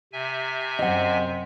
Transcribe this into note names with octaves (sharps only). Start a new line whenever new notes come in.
C3 E5 G#5
F#2 C4 D#5 F#5